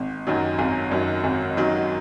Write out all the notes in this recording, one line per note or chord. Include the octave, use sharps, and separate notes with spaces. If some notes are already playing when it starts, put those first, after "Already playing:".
Already playing: G#1
F#2 D#3 F#3
G#1 F5
F#2 D#3 F#3
G#1
F#2 D#3 F#3